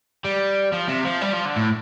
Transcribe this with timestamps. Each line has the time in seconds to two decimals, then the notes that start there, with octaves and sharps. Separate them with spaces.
0.24 G3
0.72 F3
0.88 C3
1.05 F3
1.21 G3
1.33 F3
1.45 D3
1.56 A2